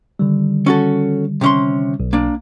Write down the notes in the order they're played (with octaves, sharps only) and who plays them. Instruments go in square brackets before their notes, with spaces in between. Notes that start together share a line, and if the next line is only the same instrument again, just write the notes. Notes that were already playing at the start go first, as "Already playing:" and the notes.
[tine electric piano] D3 D#3 G3
[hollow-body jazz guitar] C#4 F#4 A4
C3 C#4 C6
[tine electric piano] B1
[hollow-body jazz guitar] A#3 D4